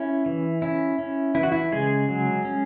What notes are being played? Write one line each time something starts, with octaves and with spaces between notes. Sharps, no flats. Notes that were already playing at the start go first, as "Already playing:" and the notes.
Already playing: C#4 E4
E3
C#4 E4
C#4
E3 E4
F#4
E4
C#3 G#3 G#4
F#3
C#4